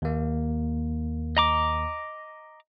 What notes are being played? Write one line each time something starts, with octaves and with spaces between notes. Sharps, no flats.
D#2 A#3
D#5 A#5 D6